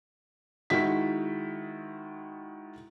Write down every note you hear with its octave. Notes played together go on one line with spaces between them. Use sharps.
D#3 G#3 E4 F#4 B6